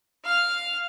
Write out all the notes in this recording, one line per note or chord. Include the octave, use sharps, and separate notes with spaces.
F5 F6